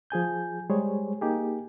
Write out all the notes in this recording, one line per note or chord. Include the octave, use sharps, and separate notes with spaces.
F3 G#4 G#5 G6
G3 G#3 G#4 C5 C#5
A#3 D#4 G4 G#4